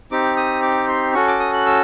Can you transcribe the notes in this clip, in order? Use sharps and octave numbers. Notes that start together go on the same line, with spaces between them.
C4 D#4 G4 D6
D#6
D6
C6
C#4 F#4 A4 C#6
D6
D#6
F#6
E6